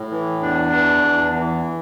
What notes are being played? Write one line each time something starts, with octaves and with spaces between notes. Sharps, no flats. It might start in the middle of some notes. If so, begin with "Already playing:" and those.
Already playing: A2
E3
E2 D4
E3
E2
E3